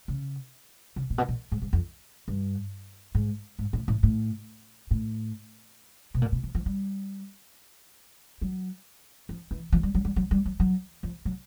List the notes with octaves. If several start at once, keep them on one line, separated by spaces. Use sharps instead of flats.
C#3
C#3
A#2
B2
A#2
G#2
G#2
F2
G2
G#2
G#2
A2
A2
A2
A2
B2
A#2
B2
F3
F3
G3
F#3
F3
E3
F3
G3
F#3
G3
F#3
G3
F#3
F#3
F3
F#3